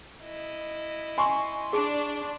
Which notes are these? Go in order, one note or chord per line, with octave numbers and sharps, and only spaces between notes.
E4 D#5
G#5 C6 C#6
D4 G#4 D5